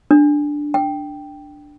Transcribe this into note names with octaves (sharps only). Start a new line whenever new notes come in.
D4
G5